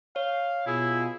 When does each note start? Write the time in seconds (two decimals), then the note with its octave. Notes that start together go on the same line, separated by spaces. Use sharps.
0.16 C#5 F5
0.67 B2 E4 F4 G#4